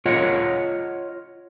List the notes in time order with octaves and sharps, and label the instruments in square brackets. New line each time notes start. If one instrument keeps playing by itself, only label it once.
[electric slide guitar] F4 C#5 D#5 F#5